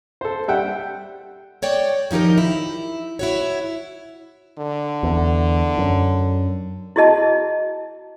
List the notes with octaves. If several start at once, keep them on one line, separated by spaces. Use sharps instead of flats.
A4 C5
G3 E5 F#5 G5
F#4 C#5 D5 G5
D#3 F3 D#4 G4 A#4
E4
E4 F#4 C#5
D3
E2
F#2
E4 F#4 G#4 D#5 A5